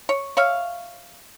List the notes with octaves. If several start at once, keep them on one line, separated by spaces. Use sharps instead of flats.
C#5
C#5 E5 F5